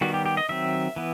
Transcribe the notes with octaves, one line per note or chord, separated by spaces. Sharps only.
D#3 G3 B3 F#4
G4
G4
D#5
D#3 F#3 C4 E5
E3 B3